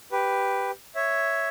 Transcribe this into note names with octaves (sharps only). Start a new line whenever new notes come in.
G4 B4
C#5 E5